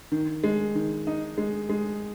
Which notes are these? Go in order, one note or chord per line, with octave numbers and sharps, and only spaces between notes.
D#3
G#3
D#3
D#4
G#3
G#3